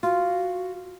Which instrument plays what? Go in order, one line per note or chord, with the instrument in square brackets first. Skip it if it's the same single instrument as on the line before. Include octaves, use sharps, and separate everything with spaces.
[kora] F4 [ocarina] F#4